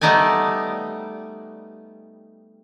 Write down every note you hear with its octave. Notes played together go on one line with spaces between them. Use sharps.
G3 A3 B3 D#4 D5 G#5